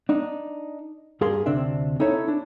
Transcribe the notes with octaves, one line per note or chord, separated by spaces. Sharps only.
D4 D#4
G2 G4 G#4 A#4 F5 C6
D2 C3 C4 D4 E5 G5
C4 D#4 E4 A4 C#5 E5
D4